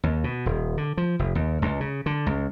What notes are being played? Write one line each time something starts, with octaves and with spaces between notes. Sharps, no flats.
D#2
B2
D#1
D3
F3
F1
D#2
C#2
C#3
D3
C#2